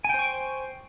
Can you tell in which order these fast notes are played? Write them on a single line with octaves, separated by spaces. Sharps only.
G#5 G5 C5 C#6